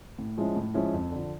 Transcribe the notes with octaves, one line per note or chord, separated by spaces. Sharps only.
A2
F3 G#3 C#4 E4
A2
F3 G#3 C#4 E4
F2
D3 F3